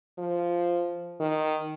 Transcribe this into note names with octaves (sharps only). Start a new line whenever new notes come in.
F3
D#3